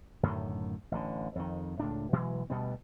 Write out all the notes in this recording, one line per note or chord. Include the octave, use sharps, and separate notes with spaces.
F#2 A2 D3 D#3
A1 D3
F2 D#3
C#2 A2 D4
B2 E3 F#3 G#3
D2 B2 G3 B3